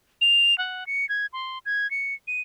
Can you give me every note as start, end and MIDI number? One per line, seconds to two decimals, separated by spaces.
0.21 0.57 101
0.58 0.87 78
0.87 1.08 97
1.09 1.26 92
1.33 1.59 84
1.66 1.90 92
1.91 2.14 97
2.28 2.41 99